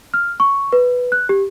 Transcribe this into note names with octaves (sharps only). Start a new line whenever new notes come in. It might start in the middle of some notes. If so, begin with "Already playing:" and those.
F6
C#6
B4
F#6
G4